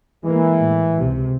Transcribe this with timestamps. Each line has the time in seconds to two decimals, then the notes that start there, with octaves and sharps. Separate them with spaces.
0.24 E3 G#3 A#3
0.58 A2
1.00 C#2 C3